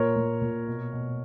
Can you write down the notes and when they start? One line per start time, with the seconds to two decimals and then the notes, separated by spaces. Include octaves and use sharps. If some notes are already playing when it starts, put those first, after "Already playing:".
Already playing: A#2 A#4 C#5
0.16 A#2
0.42 A#2
0.67 B2
0.92 B2